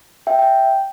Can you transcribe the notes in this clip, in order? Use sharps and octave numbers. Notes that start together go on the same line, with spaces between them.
E5 G5
G5